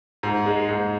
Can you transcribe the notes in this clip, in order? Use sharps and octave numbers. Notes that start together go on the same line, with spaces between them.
G#2
G#3
G#2